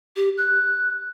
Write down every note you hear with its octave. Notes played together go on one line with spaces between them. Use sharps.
G4
F#6